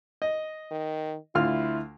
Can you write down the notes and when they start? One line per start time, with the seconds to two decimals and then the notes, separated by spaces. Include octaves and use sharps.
0.22 D#5
0.71 D#3
1.35 D2 E4 F4 F6